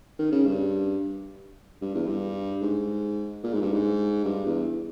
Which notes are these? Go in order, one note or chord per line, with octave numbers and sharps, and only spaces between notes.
D#3
C#3
G2
G2
E2
G2
G#2
A#2
G#2
G2
G#2
G2
E2